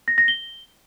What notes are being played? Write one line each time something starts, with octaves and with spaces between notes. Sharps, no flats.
A#6
A#6
G7